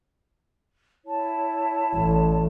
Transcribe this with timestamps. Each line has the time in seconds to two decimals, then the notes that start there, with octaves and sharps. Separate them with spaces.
1.06 E4 C#5 A5
1.95 A1